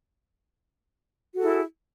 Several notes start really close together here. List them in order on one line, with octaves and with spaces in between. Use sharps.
F#4 A4 G#4 E4